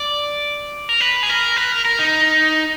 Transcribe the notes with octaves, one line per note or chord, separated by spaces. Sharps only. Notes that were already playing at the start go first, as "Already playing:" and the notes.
Already playing: D5
A#4
B4
G#4
A#4
B4
A#4
A#4
D#4